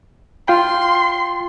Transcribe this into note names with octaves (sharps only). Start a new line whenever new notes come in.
F4 G5 C6